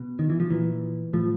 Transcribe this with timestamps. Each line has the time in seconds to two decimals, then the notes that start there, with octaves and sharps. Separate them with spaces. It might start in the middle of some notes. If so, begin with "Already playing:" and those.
Already playing: B2
0.19 D#3
0.30 E3
0.40 F3
0.50 A#2 E3
1.13 A2 F3